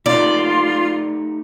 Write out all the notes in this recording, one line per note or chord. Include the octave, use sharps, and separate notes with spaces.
A3 D#4 F4 G4 D5 C6